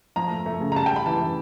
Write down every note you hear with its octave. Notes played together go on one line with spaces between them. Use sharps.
F3 A#5
A3
A3
C#3
A#5
G3 A5
G5
G3 B5
E3 A5
E3